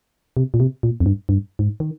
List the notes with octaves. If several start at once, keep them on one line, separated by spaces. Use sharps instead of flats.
C3
A#2
C3
A#2
F2
G2
G2
G#2
D#3